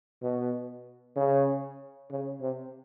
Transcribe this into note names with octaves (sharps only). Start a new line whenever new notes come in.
B2
C#3
C#3
C3